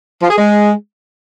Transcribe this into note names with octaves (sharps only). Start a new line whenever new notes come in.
F3
G#4
G#3